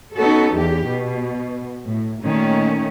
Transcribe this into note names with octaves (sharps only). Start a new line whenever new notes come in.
B3 C#4 D#4 F#4 A4
E2 G4
B2
A2
A#2 D#3 A3 C#4